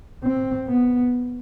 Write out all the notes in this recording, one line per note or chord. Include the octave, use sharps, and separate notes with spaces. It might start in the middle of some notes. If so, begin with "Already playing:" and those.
C4
B3